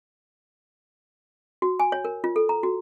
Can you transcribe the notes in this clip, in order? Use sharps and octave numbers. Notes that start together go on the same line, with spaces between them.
F#4
G#5
C#5
A#4
F4
A4
A#5
F#4